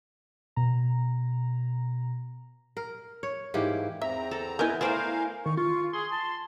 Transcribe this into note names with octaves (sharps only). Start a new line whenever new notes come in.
B2 A#5
A#4
C#5
G#2 E3 A#3 G4
E2 C4 E5 A#5
A4
B3 E4 A#4 D#5 G#5 G6
A3 B3 A#4 C5 D5 F5 G5
D#3 C#6
F4 C#6
G#4 C6
A5